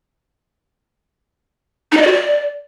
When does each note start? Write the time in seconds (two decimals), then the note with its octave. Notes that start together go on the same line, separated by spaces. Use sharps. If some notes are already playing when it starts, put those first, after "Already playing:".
1.92 D#4
1.97 D#5
2.02 D5
2.07 F#4
2.12 D5